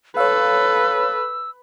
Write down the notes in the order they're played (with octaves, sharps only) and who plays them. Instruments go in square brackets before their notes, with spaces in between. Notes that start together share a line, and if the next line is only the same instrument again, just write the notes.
[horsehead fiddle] A4 [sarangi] B4 [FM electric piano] C#5 F5 [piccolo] E6